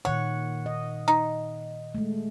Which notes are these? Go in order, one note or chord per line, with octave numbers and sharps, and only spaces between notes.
A#2 D#3 C#5 F#5
D#5
D#4
G#3 A3